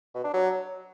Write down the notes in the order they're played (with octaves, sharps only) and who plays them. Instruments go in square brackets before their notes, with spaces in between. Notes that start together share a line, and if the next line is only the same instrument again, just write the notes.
[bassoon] B2
D4
F#3